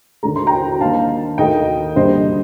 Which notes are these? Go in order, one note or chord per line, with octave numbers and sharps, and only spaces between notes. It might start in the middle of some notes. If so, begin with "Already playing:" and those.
D#2 D3 A3 A#5
C6
G5 A#5
G2 D#3 A#3 F5 A5
D#2 D#3 A3 D#5 G5
G1 G2 D3 G3 A#3 C5 D#5